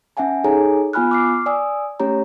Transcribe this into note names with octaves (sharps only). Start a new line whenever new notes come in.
C#4 E5 F#5 G#5 A5
D#4 G#4 A4 C#5 G#5 A#5
B3 F4 G#5 B5 F6 F#6
D6 F6 C7
D5 G#5 D#6 E6
A3 C#4 G4 C#5 A#5